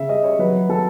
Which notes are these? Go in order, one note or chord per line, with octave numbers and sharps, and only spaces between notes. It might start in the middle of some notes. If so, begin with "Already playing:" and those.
Already playing: C#3 E5
G3 D#5
C#5
F#3 B4
F#3 A4